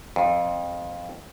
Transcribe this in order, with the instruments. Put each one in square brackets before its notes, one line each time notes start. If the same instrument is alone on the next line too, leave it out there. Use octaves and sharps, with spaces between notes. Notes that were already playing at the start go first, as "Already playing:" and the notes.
[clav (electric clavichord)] F2